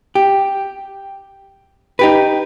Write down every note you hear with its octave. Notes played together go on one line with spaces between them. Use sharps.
G4
D#4 G4 B4